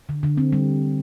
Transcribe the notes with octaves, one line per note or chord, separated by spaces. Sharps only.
D3
D3
C4
G3